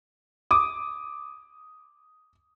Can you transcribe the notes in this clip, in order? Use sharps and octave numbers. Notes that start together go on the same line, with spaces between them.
D6 D#6